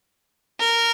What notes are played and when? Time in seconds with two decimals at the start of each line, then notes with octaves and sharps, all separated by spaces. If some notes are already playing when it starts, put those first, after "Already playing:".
0.60 A#4